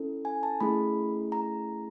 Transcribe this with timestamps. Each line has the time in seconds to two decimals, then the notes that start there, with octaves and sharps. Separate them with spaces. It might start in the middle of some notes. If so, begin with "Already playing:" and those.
Already playing: C#4 E4 A4
0.25 G#5
0.43 A5
0.60 A3 C#4 E4 G#4 B5
1.32 A#5